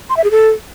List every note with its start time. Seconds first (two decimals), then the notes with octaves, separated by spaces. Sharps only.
0.10 C6
0.17 E5
0.24 G#4
0.31 A4